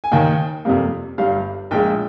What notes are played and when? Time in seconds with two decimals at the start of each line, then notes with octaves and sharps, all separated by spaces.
0.04 G#5
0.12 D#2 D#3 A#3 G5
0.65 F2 C3 G3 A#3
1.18 G1 G2 G3 F5
1.71 A#1 A#2 G#3 G5